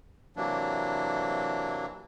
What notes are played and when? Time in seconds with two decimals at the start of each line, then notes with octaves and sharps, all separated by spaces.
0.36 C3 E3 F#3 A#3 D4